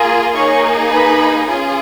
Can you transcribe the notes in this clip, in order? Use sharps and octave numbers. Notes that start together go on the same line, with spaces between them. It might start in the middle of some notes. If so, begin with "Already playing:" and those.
Already playing: A#3 F4 G#4
A#3 D#4 G#4 C#5 C#6
B4 B5
C#4 F4 G#4